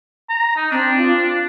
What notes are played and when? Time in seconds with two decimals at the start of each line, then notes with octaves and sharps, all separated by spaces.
0.29 A#5
0.56 D#4
0.71 C4 D4
0.97 F4